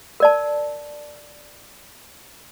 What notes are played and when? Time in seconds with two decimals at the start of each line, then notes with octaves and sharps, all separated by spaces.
0.20 A#4 D5 A5